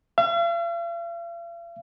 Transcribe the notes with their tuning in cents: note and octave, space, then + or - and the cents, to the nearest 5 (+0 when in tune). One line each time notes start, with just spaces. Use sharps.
F5 -45